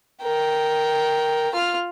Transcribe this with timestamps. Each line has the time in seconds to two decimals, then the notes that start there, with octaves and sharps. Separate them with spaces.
0.23 A#4 G5
1.54 F4 F6